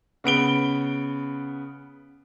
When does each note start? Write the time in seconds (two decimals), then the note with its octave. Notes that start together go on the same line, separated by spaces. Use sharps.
0.24 C#3 B3 D7 G7